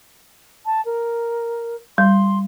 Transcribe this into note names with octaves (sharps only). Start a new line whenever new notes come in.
A5
A#4
G3 C6